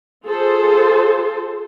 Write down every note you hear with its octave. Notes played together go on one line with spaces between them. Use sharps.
F4 G#4 A4 C5